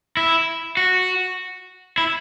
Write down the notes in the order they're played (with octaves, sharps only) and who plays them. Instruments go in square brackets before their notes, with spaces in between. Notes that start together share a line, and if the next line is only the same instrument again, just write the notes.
[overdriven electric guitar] E4
F#4
E4